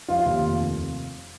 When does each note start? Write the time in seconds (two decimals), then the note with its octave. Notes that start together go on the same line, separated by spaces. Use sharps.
0.08 F3 F4
0.26 D#2
0.44 F1